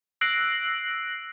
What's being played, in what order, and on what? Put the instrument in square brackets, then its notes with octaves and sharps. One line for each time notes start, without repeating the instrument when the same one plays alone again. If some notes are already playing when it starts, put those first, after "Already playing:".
[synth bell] E6 F#6 A#6 C7 D7 F#7